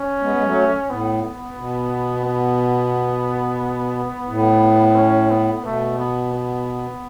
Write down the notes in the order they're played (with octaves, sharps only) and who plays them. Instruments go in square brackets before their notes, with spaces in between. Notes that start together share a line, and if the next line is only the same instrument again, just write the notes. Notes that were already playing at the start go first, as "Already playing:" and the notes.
Already playing: [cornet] C#4
[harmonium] G#3 B3
G#3
F#3 A3
[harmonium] A2 [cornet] B3
[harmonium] B2
[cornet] B3
[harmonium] A2
[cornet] C#4
B3
[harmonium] B2 [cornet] A3
[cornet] B3
B3